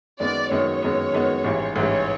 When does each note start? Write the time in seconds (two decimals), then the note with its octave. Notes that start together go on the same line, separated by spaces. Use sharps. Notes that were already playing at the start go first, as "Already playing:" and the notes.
0.20 F#2 D#3 G#3 B3 D5
0.51 F#2 D#3 G#3 B3 C#5
0.82 F#2 D#3 G#3 B3
1.13 F#2 D#3 G#3 B3
1.44 A1 G#2 E3 G3
1.76 A1 G#2 E3 G3 C#5